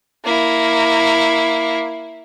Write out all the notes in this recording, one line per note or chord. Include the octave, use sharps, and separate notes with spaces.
A#3 E4